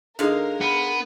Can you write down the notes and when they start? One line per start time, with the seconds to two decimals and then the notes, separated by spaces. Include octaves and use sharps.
0.19 D3 G#3 D#4 A#4 F5
0.61 B3